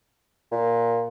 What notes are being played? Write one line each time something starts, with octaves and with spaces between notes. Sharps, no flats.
A#2